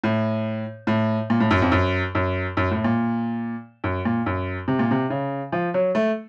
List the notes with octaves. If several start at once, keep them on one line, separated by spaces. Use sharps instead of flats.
A2
A2
A#2
A2
F#2
F2
F#2
F#2
F#2
A2
A#2
F#2
A#2
F#2
C3
A#2
C3
C#3
F3
F#3
A3